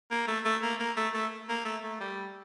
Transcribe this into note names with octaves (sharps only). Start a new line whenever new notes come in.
A#3
A3
A3
A#3
A#3
A3
A3
A#3
A3
A3
G3